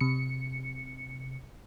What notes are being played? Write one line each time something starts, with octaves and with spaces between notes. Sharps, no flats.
C3 C#7